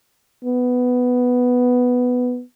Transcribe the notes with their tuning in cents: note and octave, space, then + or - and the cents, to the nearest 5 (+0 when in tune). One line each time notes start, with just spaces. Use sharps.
B3 +5